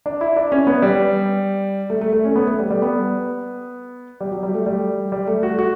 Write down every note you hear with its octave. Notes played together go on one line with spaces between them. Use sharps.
D4
E4
D4
C#4
B3
G3
A3
A3
A3
C#4
B3
A3
G3
G3
B3
G3
F#3
G3
A3
G3
G3
A3
F#4
F#4